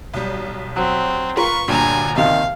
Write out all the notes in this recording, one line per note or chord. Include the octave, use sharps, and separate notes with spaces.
B1 G3
F#3 C4
F4 A#4 B4 C#6
G1 D2 G2 A#2 G#5 A#5
D#2 C3 D#3 F5